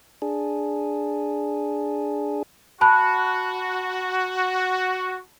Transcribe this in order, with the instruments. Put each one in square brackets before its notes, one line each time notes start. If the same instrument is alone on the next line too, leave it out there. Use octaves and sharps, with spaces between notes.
[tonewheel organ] D4 G#4
[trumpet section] F#4 [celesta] A5 B5 F#6